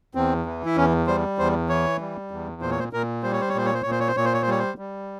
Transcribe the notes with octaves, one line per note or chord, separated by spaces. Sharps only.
E2 C4
E3
E4
E2 C#4
G3 C5
E2 C5
E3 C#5
G3
E2
A#2 C5
C#5
C5
A#2 A#4
G3 C5
C#5
C5
C#5
A#2 C5
C#5
C5
A#2 C#5
C5
C#5
C5
A#2 C#5
C5
C#5
C5
G3 C#5
C5
G3